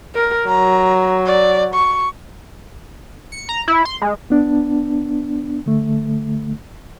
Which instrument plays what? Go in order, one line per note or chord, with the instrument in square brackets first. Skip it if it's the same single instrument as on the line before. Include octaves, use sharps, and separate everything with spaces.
[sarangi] A#4
[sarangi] F#3 [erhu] A#5
[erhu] D5
C#6
[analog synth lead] C#7
A#5
E4
C6
G#3
[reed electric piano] B3 D4
D3 A3